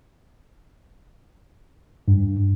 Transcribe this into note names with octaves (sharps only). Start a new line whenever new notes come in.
G2